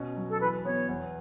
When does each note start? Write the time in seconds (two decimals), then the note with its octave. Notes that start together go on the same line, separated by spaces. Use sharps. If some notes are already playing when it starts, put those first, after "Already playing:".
Already playing: B2 C#4
0.16 F#3
0.30 A4
0.41 E3 B4
0.65 B3 C#5
0.89 E2